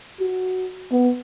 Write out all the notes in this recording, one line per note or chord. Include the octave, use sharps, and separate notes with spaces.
F#4
B3